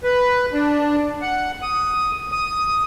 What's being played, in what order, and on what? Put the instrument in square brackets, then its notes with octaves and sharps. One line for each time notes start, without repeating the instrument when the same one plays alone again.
[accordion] B4
D4
F#5
D#6
D#6